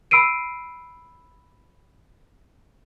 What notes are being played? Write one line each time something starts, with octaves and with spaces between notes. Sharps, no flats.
B5 E6 C7 D7 D#7